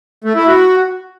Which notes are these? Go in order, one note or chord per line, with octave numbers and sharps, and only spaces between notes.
A3
E4
F#4